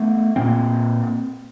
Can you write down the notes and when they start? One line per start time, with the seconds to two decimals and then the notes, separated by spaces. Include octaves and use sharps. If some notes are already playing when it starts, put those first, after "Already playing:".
Already playing: A3 B3
0.36 A#2 A#3 C4